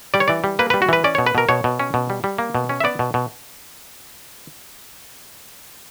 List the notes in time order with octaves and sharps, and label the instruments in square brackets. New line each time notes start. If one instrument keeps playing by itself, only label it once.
[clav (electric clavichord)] G3 D5
C#5
E3 D5
G3
A#3 B4
G3 B4
F#4
E3 B4
C#4 D5
B2 C#5
B4
B2 A#4
B2 C#5
B2
C#4
B2
G3
G3
A#3
B2
C#4
E5
B3 D5
B2
B2